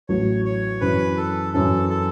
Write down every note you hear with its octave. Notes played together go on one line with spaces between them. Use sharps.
A1 A2 F#3 C#5
C#5
F#2 E3 C#4 E4 B4
A4
F#2 E3 C#4 E4 A4
A4